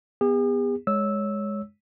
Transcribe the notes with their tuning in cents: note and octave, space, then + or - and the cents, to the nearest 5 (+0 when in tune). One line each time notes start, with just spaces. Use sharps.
B3 +0 G#4 -45
G#3 +0 C#5 +5 E6 -10